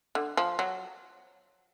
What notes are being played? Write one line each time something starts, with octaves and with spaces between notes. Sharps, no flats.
D3
F3
F#3